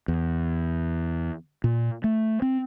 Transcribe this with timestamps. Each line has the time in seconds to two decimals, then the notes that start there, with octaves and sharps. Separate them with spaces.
0.08 E2
1.64 A#2
2.04 A3
2.42 C4